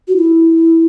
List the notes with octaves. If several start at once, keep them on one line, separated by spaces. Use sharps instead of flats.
F#4
E4